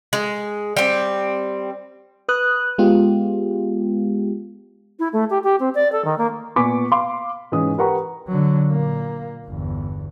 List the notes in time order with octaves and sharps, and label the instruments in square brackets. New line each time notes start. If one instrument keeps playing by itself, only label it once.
[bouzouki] G#3
G3 C4
[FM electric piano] B4 D#6 F#6
G#3 B3 F4 G4
[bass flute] E4
A3
G4
G4
C4
D5
A4
D#3
A#3
[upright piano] A#2 B3 G#5 C#6 D6 B6
F5 C6 D6
G#2 E3 C#4 D#6
G4 A#4 B4 F#5 A#5 C#6
[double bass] D3 F#3
A#2 A#3
G1 E2